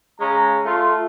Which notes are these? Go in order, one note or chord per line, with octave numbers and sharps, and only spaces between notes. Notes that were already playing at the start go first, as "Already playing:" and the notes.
C#3 G#3 C#4 A#5
A3 F4